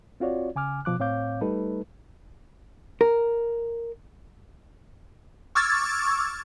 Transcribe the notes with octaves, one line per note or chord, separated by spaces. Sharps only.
C4 F4 F#4 C#5 D5
C#3 G#5 D6 F6
B2 F3 D6 F#6
A2 C4 C#5 F5 D6 G6
G3 A3 D#4 A4 B4
A#4
C#6 D6 E6 F6 G#6 A6